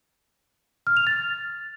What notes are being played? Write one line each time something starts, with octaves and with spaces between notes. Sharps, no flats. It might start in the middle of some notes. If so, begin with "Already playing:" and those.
F6
F7
A6